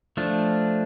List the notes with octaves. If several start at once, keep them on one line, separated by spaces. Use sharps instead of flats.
F3 A3 D4